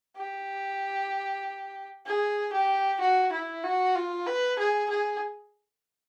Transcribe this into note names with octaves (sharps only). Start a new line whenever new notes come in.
G4
G#4
G4
F#4
E4
F#4
F4
B4
G#4
G#4